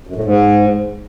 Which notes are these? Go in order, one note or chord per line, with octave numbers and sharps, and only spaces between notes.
F#2
A2
G#2